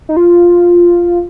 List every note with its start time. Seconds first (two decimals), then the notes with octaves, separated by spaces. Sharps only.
0.09 D#4
0.17 F4